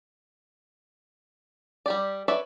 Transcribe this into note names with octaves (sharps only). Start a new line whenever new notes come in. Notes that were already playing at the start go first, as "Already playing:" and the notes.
G3 G4 D5
B4 C#5 D5 E5